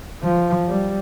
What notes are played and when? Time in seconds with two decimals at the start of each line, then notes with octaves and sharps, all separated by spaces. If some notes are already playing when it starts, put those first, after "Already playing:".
0.23 F3
0.68 G3